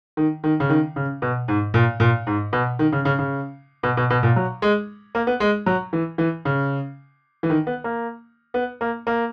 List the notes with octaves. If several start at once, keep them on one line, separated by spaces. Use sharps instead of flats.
D#3
D#3
C#3
D#3
C#3
B2
G#2
A#2
A#2
G#2
B2
D#3
C#3
C#3
C#3
B2
B2
B2
A#2
F#3
G#3
A#3
B3
G#3
F#3
E3
E3
C#3
E3
D#3
B3
A#3
B3
A#3
A#3